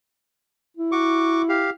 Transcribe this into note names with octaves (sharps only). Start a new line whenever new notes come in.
E4
F#4 C#6 D6
G4 F5